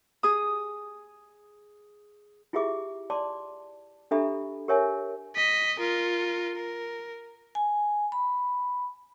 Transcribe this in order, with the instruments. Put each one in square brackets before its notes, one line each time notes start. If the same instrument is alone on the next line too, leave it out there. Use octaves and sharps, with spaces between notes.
[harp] G#4 D#6
[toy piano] E4 F4 G4 G#4 E5 D6
D5 A5 C6 D6
D4 G4 A4 E5 A#5 B5
G4 A#4 C#5 E5 G#5
[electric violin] D#5 B6
F4 A#4
A#4
[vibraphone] G#5
B5